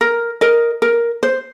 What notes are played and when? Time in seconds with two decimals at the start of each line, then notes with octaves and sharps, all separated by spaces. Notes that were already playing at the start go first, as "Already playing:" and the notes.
0.01 A#4
0.41 A#4 D#5
0.82 A#4
1.23 C5